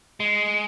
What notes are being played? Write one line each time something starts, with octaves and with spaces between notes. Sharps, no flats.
G#3